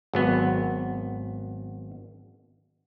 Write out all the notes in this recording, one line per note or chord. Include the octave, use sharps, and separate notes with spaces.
G#1 F#3 B3